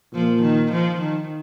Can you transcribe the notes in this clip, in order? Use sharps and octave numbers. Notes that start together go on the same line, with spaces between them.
A#2 F3
D#3
F3
D#3